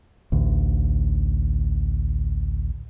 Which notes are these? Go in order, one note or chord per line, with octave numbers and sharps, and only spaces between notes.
A1 D2